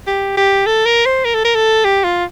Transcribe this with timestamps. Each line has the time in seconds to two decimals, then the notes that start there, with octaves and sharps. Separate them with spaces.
0.07 G4
0.37 G4
0.66 A4
0.86 A#4
1.06 C5
1.25 A#4
1.35 A4
1.45 A#4
1.55 A4
1.84 G4
2.04 F4